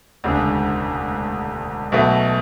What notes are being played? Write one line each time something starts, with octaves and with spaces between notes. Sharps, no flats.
E1 D2 C#3 G#3 D4
B1 B2 A3